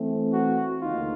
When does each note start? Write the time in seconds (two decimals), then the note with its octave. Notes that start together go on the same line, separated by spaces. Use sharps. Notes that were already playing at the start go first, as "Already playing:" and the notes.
Already playing: E3 A3 C4
0.33 F#4
0.81 D2 C#3 F3 A#3 D#4 F4